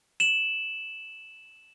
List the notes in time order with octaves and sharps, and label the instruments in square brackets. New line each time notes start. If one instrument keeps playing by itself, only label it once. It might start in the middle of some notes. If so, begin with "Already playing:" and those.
[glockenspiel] E7 F#7